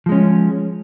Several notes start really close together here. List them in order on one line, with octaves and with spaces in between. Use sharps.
F3 G#3 C#4